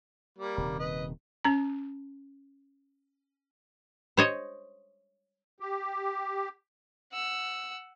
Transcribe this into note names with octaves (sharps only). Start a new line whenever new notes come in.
G3 A#3
D#1 C3 D#3
B4 D#5
C#4 A#5
C5 C#5 D#5
G4
F#5 E6